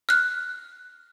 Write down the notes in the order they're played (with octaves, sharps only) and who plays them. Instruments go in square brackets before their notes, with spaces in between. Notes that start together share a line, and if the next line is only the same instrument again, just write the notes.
[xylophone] F6 F#6